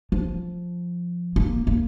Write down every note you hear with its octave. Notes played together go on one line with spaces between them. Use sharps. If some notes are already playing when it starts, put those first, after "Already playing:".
F3
A#3
A#3